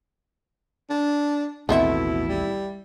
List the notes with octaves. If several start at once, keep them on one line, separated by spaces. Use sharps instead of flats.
D4
A1 D#2 B2 A3 B3 C4 E4 E5
G3